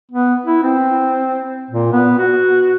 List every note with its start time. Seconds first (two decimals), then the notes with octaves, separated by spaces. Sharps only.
0.12 B3
0.46 E4
0.63 C4
1.71 A#2
1.92 B3
2.19 F#4